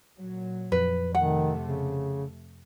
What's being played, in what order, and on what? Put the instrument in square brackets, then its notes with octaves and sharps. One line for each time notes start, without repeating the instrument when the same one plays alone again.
[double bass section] A#2 F#3
[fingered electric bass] F2 [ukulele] B4
[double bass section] C3 A3 [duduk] D#3 [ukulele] F#5
[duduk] C#3